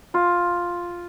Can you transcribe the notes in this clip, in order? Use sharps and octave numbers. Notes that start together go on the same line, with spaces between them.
F4